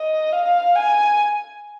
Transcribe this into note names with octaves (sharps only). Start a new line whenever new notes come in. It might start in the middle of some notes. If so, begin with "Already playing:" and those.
Already playing: D#5
F5
G#5